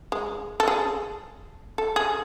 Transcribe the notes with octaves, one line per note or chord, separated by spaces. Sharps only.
G#3
A4
G#4
A4
G#4